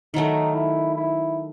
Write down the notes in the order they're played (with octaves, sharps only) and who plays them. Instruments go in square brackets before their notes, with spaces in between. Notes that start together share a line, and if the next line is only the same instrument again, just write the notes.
[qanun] D#3 F#3 A3 [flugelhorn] D#4
[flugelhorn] E4
E4